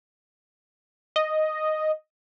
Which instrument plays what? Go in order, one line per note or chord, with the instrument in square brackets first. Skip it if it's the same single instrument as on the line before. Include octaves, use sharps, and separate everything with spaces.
[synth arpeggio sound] D#5